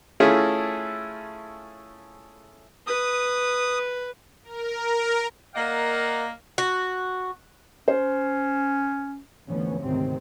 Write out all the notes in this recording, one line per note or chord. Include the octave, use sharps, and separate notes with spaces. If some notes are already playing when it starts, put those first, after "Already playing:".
A3 C#4 E4 F4 G#4 A4
B4 D#6
A#4
A#3 A#4 D5 D#5 F5 F#5
F#4
C#4 C5
G#1 D2 E3 F3 B3 C#4
D2 G#2 C3 D#3 C4